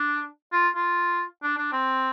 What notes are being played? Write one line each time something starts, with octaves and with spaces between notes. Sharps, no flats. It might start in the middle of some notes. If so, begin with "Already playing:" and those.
Already playing: D4
F4
F4
D4
D4
C4